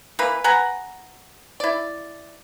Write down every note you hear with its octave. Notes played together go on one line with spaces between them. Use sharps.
E3 A#3 B4
B4 F#5 G#5 A#5
E4 D5